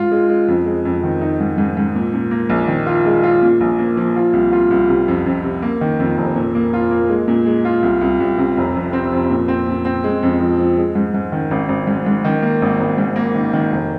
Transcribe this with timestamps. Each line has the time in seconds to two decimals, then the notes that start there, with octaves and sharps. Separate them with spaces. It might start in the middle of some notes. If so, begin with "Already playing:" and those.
Already playing: G#2 F4
0.12 G#3
0.29 G#3
0.48 F2
0.66 G#3
0.85 F2
1.03 D#3
1.21 D#4
1.40 G#2
1.58 G#2
1.77 G#2
1.95 A#2
2.13 A#2
2.31 A#3
2.50 A#1
2.68 D#3
2.86 F4
3.06 G#3
3.23 F4
3.42 A#2
3.61 A#1
3.79 A#3
3.97 F3
4.16 F4
4.33 C2
4.52 F4
4.71 C2
4.89 C3
5.08 F2
5.26 F2
5.44 C3
5.62 A#3
5.81 D#3
6.00 F2
6.18 F1
6.36 A#2
6.55 A#3
6.73 F4
6.91 A#3
7.09 G#3
7.28 A#2
7.46 G#3
7.65 F4
7.83 C2
8.01 C2
8.20 C2
8.38 C3
8.57 F1
8.76 F2
8.93 C4
9.12 F2
9.30 A#2
9.48 C4
9.67 A#2
9.85 C4
10.04 G#3
10.23 F2
10.40 F3
10.59 F3
10.77 G#3
10.95 G#2
11.14 G#2
11.32 D#3
11.51 G#1
11.69 G#1
11.87 G#2
12.06 G#2
12.25 D#3
12.43 A#3
12.62 G#1
12.80 G#1
12.98 G#2
13.16 A#3
13.35 D#3
13.53 D#3
13.72 F1